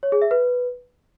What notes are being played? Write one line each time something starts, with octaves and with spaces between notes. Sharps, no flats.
C#5
G#4
E5
B4